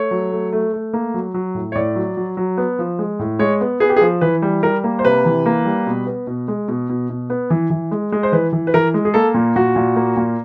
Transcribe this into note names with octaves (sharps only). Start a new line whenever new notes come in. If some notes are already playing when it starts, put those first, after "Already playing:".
Already playing: A3 C#5
F#3
A3
A3
A3
A#3
F#3
F#3
A2
C#5
A2 D5
F#3
F#3
F#3
B3
F3
G#3
A2
G#3 C#5
B3
B3 G#4
G4
G#4
F3
E3 B4
G3
G3 A#4
A#3
C5
C3 B4
E3
A#3
G3
B2
B3
B2
G#3
B2
B2
B2
B3
E3
E3
G#3
G#3
C5
E3 B4
E3
B4
E3 A#4
G#3
G#4
A#3 A4
A#2
A#2 F#4
A#2
A#3
A#2